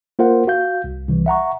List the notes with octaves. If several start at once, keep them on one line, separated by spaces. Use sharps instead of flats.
A#3 F4 A#4 C5 F#5
F#4 F5 G6
C2
C2 E3
E5 F#5 A#5 C#6